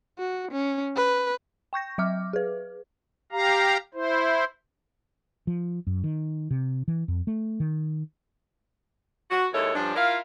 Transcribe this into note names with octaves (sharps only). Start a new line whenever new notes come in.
F#4
C#4
B4
G5 C#6 G6 A#6
F#3 E5 D6 F6
G#4 B4
G4 F5 A#5
E4 C5
F3
F#2
D#3
C3
E3
F2
A3
D#3
F#4
D#2 G#3 E4 A4 C#5
G2 F3 C#4 D4
E4 F4 A#4 F5